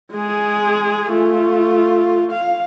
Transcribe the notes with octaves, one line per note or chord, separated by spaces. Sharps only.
G#3 G#4
A3 F4
F5